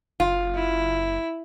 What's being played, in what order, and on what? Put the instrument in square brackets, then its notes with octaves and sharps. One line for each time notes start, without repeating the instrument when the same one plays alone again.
[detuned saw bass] F#1 [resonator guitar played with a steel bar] F4
[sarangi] E4